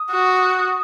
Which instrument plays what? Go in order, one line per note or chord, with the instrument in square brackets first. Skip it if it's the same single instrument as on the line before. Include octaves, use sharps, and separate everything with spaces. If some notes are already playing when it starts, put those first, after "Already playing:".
Already playing: [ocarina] D#6
[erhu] F#4